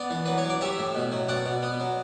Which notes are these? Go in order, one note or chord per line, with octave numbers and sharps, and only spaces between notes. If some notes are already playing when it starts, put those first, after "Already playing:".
Already playing: B3 D5
E3
F#3 B4
C#5
F#3
D5
G3 C#5 E5
A2
B2
F#3
B2 D5 F#5
B2
B3
F#3